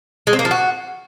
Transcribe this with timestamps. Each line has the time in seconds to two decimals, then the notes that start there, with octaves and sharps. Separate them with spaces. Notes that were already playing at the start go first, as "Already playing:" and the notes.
0.27 G#3
0.33 C4
0.39 A#3
0.45 F3
0.51 F#4